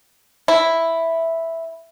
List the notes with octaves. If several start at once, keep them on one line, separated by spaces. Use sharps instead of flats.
E4